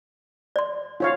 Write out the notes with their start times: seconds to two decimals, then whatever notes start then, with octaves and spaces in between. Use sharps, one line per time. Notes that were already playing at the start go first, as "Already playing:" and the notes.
0.56 D5 C6
1.00 F4 C#5 F5